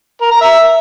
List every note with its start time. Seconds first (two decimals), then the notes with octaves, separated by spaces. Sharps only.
0.22 A#4
0.31 A#5
0.41 E5